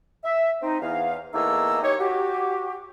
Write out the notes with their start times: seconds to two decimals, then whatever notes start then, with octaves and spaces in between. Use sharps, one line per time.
0.24 E5
0.61 C4 D#4
0.81 E2 F5
1.34 E2 A3 A#3 D#4 D#5 E6
1.82 D#4 G4 C#5
1.99 F#4 G4